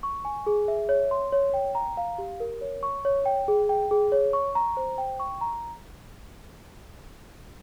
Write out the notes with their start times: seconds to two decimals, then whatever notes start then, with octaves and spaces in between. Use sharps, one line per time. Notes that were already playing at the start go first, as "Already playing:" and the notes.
0.03 C#6
0.25 G#5
0.46 G#4
0.68 E5
0.89 C#5
1.11 C6
1.33 C#5
1.54 G5
1.75 A#5
1.97 F5
2.18 G4
2.40 A#4
2.61 C#5
2.83 C#6
3.05 C#5
3.26 G5
3.48 G#4
3.69 G5
3.91 G#4
4.12 C#5
4.33 C#6
4.55 A#5
4.77 C5
4.98 G5
5.20 C#6
5.41 A#5